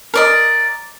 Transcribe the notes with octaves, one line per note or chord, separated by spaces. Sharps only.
A#4 D5 D#5